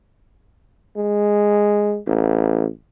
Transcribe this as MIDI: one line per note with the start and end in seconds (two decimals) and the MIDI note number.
0.97 1.97 56
2.07 2.66 33